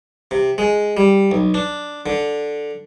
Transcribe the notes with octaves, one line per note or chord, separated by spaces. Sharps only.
C3
G#3
G3
B1
D4
D3